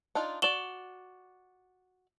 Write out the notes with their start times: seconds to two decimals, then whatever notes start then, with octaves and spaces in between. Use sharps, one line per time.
0.15 D4 D#4 F4
0.42 F#4 D5 E7 F#7 G7